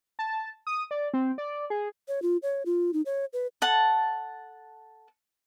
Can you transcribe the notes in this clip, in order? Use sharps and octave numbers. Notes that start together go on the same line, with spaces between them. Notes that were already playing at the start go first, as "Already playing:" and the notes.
A5
D#6
D5
C4
D5
G#4
C#5
F4
C#5
F4
D#4
C#5
B4
A4 F#5 A5